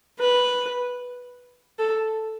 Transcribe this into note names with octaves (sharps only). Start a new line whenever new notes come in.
B4
A4